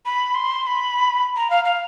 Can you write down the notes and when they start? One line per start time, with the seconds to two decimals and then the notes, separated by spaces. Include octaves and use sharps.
0.06 B5
0.35 C6
0.63 C6
0.67 B5
1.36 A#5
1.50 F5
1.65 F5